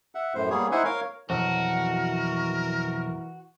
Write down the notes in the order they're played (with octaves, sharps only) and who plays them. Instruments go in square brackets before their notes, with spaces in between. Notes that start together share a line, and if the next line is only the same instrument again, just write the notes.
[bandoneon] E5 F#5
F#2 A2 C5
G3 A#3 B3 G#4 C#5
D#4 E4 C5 E5 F#5 G#5
A#4 C#5 F5
[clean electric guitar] B1 F2 [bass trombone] E3 [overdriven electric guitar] F#4 [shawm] A#4